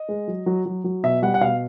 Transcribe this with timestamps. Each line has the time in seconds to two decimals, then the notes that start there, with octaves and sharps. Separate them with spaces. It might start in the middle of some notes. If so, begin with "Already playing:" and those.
Already playing: D#5
0.09 G#3
0.28 F#3
0.46 F#3
0.66 F#3
0.84 F#3
1.03 B2 E5
1.22 G3 F#5
1.34 F#5
1.41 B2 F5